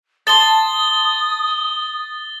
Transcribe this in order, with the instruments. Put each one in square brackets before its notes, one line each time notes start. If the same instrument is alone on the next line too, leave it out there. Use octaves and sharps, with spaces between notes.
[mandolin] A5 C6 [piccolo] D#6 [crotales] A6 G7